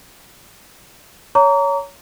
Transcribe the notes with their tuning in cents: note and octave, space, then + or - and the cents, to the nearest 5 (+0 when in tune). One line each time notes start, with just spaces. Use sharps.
C#5 +15 A#5 -10 D6 -45